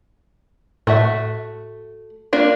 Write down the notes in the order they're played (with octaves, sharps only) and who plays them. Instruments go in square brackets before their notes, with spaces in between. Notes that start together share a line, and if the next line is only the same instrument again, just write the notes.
[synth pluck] A2 [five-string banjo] A3 F#4 E5
[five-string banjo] A#3 D4 F4